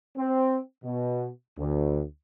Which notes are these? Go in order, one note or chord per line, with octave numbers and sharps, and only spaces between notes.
C4
B2
D2